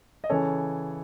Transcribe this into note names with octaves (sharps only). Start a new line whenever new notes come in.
D#5
C#3 E3 A4 C#5